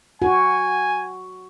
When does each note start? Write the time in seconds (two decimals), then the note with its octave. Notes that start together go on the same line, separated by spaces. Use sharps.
0.22 F#4 G#5